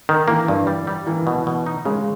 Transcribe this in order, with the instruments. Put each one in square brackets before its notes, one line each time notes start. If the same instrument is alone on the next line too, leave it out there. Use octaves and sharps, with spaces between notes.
[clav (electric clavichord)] D#3
[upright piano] E3 [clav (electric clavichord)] A#3
[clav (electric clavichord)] G2
G3
G3
[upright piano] E3 [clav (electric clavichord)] A#3
[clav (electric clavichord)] B2
B2
D#4
[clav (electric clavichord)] C#3 [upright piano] G#3